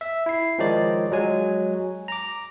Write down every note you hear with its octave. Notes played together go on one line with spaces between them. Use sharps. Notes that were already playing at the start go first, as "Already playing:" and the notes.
E5
E4 C7
D#3 F3 G#3 D#4 C#5 D5
F#3 G#3 C#5 G#5
A#5 D6